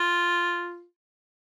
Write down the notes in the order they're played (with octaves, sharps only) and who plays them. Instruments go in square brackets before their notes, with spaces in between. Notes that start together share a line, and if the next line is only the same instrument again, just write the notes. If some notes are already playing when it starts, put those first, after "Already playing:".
Already playing: [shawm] F4